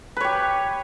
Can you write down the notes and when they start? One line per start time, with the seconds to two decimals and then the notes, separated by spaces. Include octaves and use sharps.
0.17 B4
0.20 C#5
0.24 G4